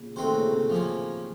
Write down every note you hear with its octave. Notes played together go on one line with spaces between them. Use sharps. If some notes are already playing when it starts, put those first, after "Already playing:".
Already playing: A#2 C#3
C3 D#3 A3 C4 F#4 C5
C3
A#2 C#3
A2 C3
F3 A#3 C#4